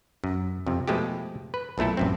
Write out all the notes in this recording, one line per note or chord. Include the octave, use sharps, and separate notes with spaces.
F#2
F2 C3
B2 F3 G#3 A3 G4
B4
B1 A#2 A3 E4 A4
A1 F#2 C4